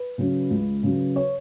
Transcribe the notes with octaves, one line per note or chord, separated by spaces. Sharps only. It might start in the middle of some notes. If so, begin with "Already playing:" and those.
Already playing: B4
C#3 F#3 C#4
C#2
C#3 F#3 C#4
C#5